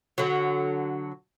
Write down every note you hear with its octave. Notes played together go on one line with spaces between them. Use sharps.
D3 F#3